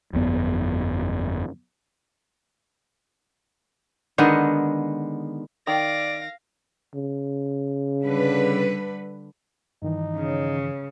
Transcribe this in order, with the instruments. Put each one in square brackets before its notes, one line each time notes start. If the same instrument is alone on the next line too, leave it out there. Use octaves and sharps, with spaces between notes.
[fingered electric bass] G1 F2 B3
[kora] D3 D#3 G#3 B3
[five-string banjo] D#3 [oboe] D5 [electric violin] F5 A#6
[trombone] C#3
[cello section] D3 G3 B4
[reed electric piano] G2 D#3 E3 [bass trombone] D#4
[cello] C#3 [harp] C#4